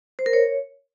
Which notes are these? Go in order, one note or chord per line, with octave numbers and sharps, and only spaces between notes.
C5
A#4
C#5